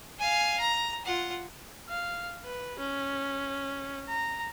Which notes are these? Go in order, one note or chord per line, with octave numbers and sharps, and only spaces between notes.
F5 G#5
A#5
F4 F#5
F5
B4
C#4
A#5